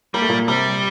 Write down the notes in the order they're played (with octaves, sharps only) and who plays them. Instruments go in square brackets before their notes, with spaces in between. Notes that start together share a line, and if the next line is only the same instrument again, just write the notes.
[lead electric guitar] G3 [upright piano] A#3
[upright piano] A3
A#2 A#3
[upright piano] C3 C4 [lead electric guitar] G3